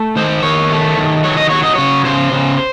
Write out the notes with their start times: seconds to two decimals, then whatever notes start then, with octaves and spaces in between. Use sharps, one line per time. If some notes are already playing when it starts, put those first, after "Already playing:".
Already playing: A3
0.16 D#3 C5
0.43 D#3 C#5
0.70 A3
0.98 D#3
1.24 F#3 C#5
1.37 D#5
1.49 F#3 C#5
1.63 D#5
1.75 C#3 C#5
2.05 C#3 C5
2.32 C#3